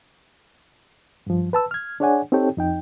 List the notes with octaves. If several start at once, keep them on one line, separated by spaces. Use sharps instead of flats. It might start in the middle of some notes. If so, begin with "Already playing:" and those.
G2 F3
B4 A5 E6
F6 G#6
D4 G#4 C#5 D5 F#5 G#5
C4 D#4 G4 A4 C#5 G5
F2 D#4 G5